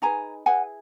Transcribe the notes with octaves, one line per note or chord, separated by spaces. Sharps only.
D#4 G#4 B4 G#5 A#5
E4 G#4 B4 F#5 G#5